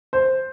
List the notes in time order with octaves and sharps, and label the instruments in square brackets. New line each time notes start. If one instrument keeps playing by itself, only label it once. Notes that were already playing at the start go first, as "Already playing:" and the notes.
[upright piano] C5